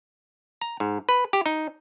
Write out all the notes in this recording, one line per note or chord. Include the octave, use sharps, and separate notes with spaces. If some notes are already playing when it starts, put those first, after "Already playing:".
A#5
G#2
B4
G4
D#4